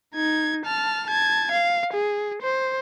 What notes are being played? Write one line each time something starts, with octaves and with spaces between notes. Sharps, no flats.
D#4 G#6
A5 F6
A5 G#6
F5
G#4
C5